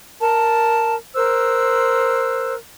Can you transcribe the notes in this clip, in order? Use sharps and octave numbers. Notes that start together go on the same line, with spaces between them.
A#4 A5
A#4 C5 E6 F#6